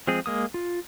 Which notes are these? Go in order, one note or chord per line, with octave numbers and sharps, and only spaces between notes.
F3 G#3 C4 G#4
G#3 A#3 D#6
F4